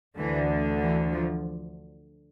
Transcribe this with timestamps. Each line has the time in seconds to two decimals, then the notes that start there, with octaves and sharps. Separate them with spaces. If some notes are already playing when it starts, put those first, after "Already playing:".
0.17 D2 D3 E3
0.81 E3
1.13 F3